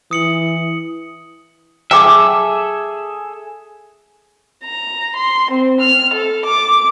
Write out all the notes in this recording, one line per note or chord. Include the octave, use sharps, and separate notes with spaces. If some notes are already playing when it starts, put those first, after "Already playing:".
E3 D#6 C#7 F#7
G#4 A4 E5 G5 G#5 D6
A#5
C6
C4
F6
A4
D6